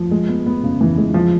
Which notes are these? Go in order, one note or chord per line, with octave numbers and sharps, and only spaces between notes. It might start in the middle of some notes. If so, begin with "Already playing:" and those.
Already playing: F3
G#3
B3
B3
C#3
E3
G#3
F3